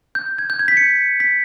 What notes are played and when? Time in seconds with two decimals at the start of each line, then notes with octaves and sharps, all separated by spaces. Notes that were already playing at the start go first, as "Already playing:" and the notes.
0.15 G6
0.39 G#6
0.50 G6
0.59 G#6
0.68 B6
0.77 C#7
1.20 B6